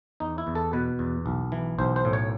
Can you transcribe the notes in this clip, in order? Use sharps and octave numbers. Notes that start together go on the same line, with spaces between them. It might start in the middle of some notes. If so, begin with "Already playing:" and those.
E2 D#4
E4
E2
A4
B2 B4
E2
B1
E3
B1 C5
C5
A2
C#5